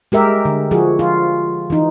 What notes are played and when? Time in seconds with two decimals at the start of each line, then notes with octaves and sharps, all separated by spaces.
0.12 G#3 G4 A#4 E5
0.45 D3
0.71 F3 F#4 G#4
0.99 F4
1.70 E3 D#4